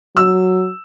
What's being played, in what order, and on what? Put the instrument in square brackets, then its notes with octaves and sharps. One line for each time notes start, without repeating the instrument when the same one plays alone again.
[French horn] F#3 [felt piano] E6